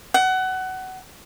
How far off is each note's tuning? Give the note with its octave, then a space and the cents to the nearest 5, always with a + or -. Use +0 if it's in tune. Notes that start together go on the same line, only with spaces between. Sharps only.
F#5 +20